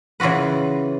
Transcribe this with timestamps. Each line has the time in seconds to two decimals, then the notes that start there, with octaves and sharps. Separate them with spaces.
0.20 C#3 E3 F4 F#4 B4